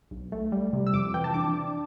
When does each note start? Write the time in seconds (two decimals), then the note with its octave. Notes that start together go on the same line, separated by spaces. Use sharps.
0.11 B1
0.32 A3
0.52 G3
0.73 C3
0.87 E6
0.93 F2 D6
1.14 E3 G5
1.24 A5
1.34 D4 D6